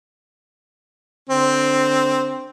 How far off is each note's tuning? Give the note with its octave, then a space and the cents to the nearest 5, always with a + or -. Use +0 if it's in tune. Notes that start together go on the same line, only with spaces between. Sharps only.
D3 +0 C4 +0